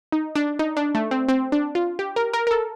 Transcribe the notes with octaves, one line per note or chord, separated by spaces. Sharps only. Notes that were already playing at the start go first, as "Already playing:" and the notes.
D#4
D4
D#4
D4
A3
C4
C4
D4
F4
G4
A#4
A#4
A#4
A4